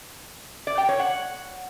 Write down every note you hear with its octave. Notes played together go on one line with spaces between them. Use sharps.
D5
G5
C#5
F#5